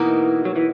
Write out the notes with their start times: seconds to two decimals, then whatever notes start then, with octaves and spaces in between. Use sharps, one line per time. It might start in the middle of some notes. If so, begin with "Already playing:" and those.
Already playing: B2 E3 A#3 D#4 F#4
0.45 F#3
0.56 E3